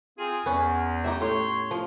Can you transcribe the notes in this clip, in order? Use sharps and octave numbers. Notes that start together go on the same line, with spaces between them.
C4 F4 G#4
E2 B3 C#4
D#4 G4 E5
A2 C#5 C6
F3